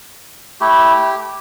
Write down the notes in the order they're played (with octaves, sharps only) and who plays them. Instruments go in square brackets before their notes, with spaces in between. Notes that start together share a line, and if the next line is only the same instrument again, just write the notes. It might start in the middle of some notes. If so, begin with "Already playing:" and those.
[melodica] A3 E4 G4